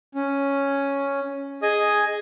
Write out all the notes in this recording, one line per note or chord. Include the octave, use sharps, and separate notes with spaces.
C#4
G#4 D#5 G#5 D#6